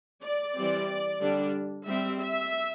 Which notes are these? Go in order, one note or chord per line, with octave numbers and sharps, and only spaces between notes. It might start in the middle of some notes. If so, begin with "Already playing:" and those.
D5
E3 G3 C4
D3 G3 D4
G3 C4 E5
E5